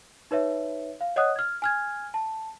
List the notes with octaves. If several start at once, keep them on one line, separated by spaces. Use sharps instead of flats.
D#4 B4 C#5 E5
F5
C#5 D#5 F#5 D#6 F#6
F6 G#6
G#5 F6 G#6
A5